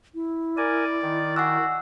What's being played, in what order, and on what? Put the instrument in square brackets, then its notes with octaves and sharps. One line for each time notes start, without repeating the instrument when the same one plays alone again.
[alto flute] E4
[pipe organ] A#4 G#5 [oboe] D5
[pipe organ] D#3
[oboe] F#4 [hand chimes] F#5 G#5 E6